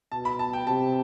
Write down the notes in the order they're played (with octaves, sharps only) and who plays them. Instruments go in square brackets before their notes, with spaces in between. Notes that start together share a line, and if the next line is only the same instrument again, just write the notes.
[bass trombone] B2 [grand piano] A5
[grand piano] B5
A5
G5
[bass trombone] C3 [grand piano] A5